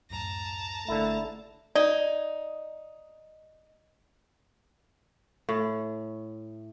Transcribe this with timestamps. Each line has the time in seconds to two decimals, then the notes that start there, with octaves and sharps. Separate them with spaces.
0.10 C#2 F#2 A2 A5 A#5
0.88 G#1 D3 A3 A#3 E4 F5
1.75 D#4 D5
5.49 A2